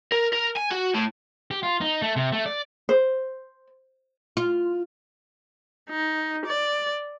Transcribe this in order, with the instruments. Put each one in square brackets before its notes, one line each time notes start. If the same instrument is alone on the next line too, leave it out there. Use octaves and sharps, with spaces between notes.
[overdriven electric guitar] A#4
A#4
G#5
F#4
A2
[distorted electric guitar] G4
F4
D#4
A3
C3
A3
D5
[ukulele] C5
[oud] F4
[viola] D#4
D5